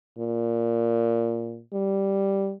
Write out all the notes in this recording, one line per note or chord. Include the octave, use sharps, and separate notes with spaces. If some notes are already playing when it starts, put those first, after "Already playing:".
A#2
G3